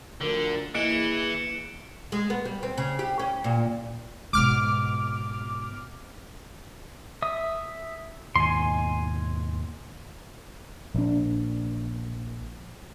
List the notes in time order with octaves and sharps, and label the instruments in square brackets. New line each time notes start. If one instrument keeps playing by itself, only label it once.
[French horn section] D2 F3 A#4 [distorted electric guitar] D3 [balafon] A4
[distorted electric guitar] E3 [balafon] A#3 D#5 [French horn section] E4 G#4 [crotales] C#7 D7 E7
[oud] G#3
B3
G3
C4
C#3
G4
C#4
A#2
[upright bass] G#2 B2 [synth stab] D6 F6
[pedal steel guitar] E5 D#6
[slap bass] D#2 G#2 B2 [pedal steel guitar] G#5 C6
[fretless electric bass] A#1 D4